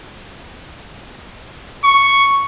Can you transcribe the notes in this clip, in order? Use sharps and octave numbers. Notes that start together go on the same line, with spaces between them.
C#6